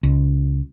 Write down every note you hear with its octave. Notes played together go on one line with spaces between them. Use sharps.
C#2